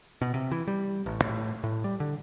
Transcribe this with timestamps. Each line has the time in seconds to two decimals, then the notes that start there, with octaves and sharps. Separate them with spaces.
0.21 B2
0.34 C3
0.52 E3
0.67 G3
1.06 A1
1.22 A2
1.64 A2
1.84 G3
2.00 D3